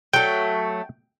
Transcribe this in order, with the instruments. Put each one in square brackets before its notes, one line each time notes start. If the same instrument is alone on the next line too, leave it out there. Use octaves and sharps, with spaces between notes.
[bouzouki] F#3 A3 [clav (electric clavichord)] G5